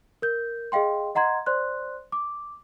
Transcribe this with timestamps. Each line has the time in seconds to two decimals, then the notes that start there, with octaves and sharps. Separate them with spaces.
0.22 A#4 G6
0.72 G#4 D#5 F5 G5 C6
1.15 D#5 F#5 A#5 C6 G#6
1.46 C5 D5 C6 F#6
2.12 D6